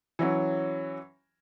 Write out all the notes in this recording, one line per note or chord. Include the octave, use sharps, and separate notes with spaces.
E3 F#3 C#4